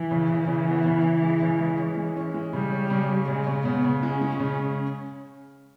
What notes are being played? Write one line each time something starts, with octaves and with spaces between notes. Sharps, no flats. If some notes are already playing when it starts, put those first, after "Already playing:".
Already playing: E3
C#3
C#3
C#3
B3
C#3
C#3
G#3
C#3
G#3
C#4
G#3
C#4
G#3
C#3 G3
C#4
C#3
C#4
C#3 G#3
C#3
C#3 B3
C#3
G#3 C#4
G#3
C#3